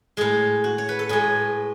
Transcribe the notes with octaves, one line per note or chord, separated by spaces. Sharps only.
A2 G#3 G#4
F#4
C#5
B4
A4
A2 G#3 G#4